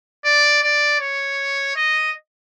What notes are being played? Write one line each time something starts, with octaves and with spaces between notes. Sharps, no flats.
D5
D5
C#5
D#5